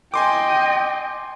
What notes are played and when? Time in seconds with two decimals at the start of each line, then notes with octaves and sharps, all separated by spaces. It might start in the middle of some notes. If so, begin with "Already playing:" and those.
0.14 D#5 G5 G#5 C6 D6